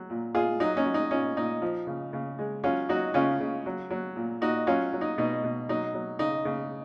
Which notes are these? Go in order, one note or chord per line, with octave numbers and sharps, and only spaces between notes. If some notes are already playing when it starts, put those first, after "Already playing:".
Already playing: F#3
A#2
A#2 F4 G#4
F#3 D#4
C#4
F#3
D#4
A#2 C#4
A#2 D#4
F3
C#3
C#3
G#3
F#3 C#4 F4
F#3 D#4 F#4
C#3 C#4 F4
C#3
F#3
F#3
A#2
A#2 D#4 F#4
F#3 C#4 F4
F#3
D#4
B2 D#4
B2
F#3 D#4
F#3
C#3 D#4
C#3